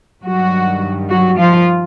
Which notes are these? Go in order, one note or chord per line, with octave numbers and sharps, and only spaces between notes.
G2 D#3 F#3 G3 F#4
F#3 F#4
F3 F4